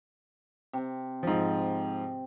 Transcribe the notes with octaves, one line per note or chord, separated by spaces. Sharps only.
C3 C4
G#2 F3